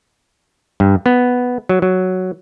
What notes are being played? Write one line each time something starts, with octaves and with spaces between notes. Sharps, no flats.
G2
B3
F#3
F#3